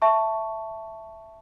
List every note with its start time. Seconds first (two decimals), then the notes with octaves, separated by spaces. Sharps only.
0.02 E5 A5 C#6